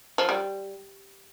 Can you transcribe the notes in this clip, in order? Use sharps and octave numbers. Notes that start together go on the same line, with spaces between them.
F3
G3